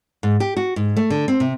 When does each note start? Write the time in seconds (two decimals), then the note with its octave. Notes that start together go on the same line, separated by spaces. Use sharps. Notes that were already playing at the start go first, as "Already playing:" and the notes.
0.23 G#2
0.40 G4
0.56 F#4
0.76 G#2
0.97 A3
1.10 D3
1.28 C4
1.40 C3